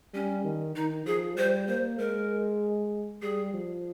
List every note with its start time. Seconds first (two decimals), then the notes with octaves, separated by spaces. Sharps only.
0.14 G3 C#4
0.44 D#3
0.75 D#3 D#4
1.06 F3 G#4
1.37 G3 C5
1.68 A#3 C5
1.99 G#3 A#4
3.22 G3 G#4
3.54 F3